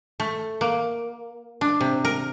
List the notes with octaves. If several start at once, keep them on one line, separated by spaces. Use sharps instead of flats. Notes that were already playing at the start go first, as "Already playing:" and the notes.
A3
A#3
D4
C3
A#4